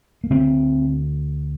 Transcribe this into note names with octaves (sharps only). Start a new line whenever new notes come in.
A#3
D2 D3 C4